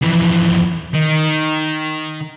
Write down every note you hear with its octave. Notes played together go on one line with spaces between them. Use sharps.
F2 E3
D#3